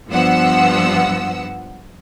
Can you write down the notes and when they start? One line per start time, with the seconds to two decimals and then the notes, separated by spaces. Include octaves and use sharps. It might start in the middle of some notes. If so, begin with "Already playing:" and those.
0.10 G2 F3 B3 F#5 E6